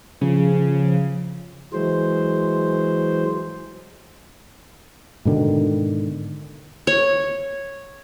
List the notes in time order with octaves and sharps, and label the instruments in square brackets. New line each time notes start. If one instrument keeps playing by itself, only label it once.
[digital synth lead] C#3 [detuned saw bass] F3
[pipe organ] E3 F#3 G#3 C5
[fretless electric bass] G#2 B2 D3 D#3
[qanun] C#5